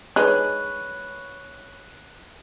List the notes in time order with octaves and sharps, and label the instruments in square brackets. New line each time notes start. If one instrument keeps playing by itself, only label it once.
[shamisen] G#3 D4 D#4 [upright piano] B4 C#5 [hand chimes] F#6